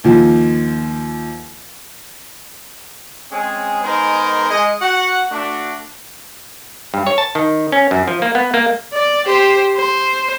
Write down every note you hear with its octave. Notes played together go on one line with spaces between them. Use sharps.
D#2 F3
G#3 C4 C#4 G#4
D#3 G#3 B3 G#4 A#4 C5
G#3 D#5
F#4 F#5
A3 D4 F#4
G2
C#5
A5
D#3
C#4
F#2
F3
A#3
B3
A#3
D5
G4 C5
C5